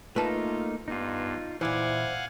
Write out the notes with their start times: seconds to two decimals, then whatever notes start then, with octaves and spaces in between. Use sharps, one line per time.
0.16 A3 A#3 D#4 F4 B4 A5
0.88 G2 B3 D#4 F4
1.61 A#2 E3 E4 C5 F5 F#5 G#5 D6